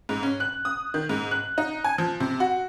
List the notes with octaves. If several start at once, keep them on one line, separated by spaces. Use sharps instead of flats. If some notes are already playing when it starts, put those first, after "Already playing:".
G#2
C#4
F#6
D#6
D#3
G#2
F#6
D#4
G#5
F3
C3
F#4